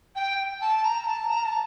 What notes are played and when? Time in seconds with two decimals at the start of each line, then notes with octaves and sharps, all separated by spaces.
0.15 G5
0.61 A5
0.84 A#5
1.03 A#5
1.07 A5
1.30 A#5
1.45 A5